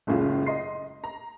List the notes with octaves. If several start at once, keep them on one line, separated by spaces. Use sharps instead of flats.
F#1 C#2 A2 C#3 F4
D#5 C6 C7
A#5